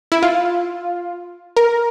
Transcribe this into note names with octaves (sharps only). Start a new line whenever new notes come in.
E4
F4
A#4